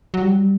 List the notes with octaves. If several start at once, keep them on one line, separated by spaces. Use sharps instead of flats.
F#3
G3